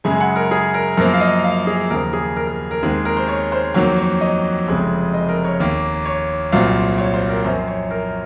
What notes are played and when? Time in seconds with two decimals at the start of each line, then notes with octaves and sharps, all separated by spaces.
0.04 F#2 C#3 G#3 G#5
0.20 F#5
0.36 A#4
0.51 G#4
0.74 A#4
0.97 F#2 F3 A#3 A#4
1.14 F5
1.20 D#5
1.44 F5
1.67 G#4
1.90 D#2 C#3 F3 A#4
2.13 G#4
2.37 A#4
2.47 A#4
2.71 A#4
2.83 D#2 D#3 G#3 C4 G#4
3.05 A#4
3.17 C5
3.28 C#5
3.52 C5
3.74 F2 D#3 F#3 A#3 C#5
3.98 C#5
4.21 D#5
4.68 F1 F2 C#3 G#3 C4
5.14 D#5
5.29 A#4
5.44 C#5
5.60 D#2 D#3 A#3
6.05 C#5
6.52 C2 A#2 F#3 C4 F5
6.98 C#5
7.14 C5
7.29 A#4
7.45 F#2 F3 C4 C5
7.67 C#5
7.91 A#4